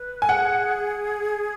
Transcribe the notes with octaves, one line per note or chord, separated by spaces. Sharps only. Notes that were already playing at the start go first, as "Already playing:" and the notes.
Already playing: B4
G#5
G#4 F#5